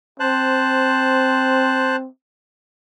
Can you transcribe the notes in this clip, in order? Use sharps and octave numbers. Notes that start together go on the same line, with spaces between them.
C4 C5 A5 F#6